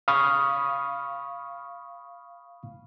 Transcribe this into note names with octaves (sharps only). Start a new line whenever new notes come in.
F5 B5 C#6 D#6 F6